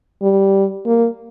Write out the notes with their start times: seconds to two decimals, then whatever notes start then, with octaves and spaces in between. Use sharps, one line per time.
0.22 G3
0.86 A#3